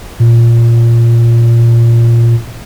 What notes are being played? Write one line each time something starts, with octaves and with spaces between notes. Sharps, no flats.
A#2